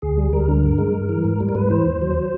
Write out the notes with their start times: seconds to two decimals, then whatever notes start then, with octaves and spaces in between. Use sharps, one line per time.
0.02 D2 G#4
0.17 G3
0.33 D2 A#4
0.48 D3
0.64 G2
0.78 G#3
0.94 G2
1.09 E3
1.24 G#2
1.40 G3
1.49 A#4
1.55 G#2 B4
1.70 E3 C5
1.86 D#2
2.01 F#3